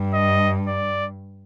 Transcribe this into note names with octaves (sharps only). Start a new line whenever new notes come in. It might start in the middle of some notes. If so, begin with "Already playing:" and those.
Already playing: G2
D#5
D5